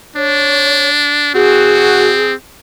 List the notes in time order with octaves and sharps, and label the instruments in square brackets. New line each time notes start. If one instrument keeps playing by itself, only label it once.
[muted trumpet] D4 [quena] C#5
[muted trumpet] C4 [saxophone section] F#4 [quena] G#4